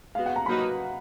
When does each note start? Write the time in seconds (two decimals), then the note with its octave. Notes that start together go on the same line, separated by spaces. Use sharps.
0.15 G#3 B3 F#4 F5
0.26 F#5
0.36 A#5
0.46 F#3 A#3 D#4 F#4 B4 B5